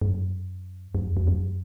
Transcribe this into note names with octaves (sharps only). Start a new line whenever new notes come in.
G2
F#2
F2
F#2
F2
F2
F#2